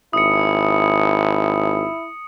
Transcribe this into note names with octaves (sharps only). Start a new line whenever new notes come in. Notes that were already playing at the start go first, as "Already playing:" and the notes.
G#1 E4 D#6 C#7